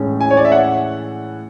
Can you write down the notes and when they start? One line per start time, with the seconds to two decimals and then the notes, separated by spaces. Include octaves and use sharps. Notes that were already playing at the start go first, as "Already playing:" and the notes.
Already playing: A2 E3 G#3 C#4
0.21 G#5
0.31 C#5
0.37 D5
0.45 E5
0.52 F#5